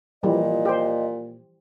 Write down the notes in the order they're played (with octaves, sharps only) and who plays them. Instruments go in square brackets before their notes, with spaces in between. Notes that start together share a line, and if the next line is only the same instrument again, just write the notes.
[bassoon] A#2 [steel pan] E3 F3 G3 [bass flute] D#5
[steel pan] G4 C5